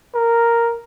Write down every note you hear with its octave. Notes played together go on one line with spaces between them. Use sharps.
A#4